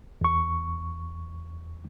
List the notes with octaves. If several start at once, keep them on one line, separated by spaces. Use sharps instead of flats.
E2 C#6